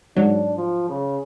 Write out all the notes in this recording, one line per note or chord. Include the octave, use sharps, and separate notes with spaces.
G#2 F#3 D4
F3
C#3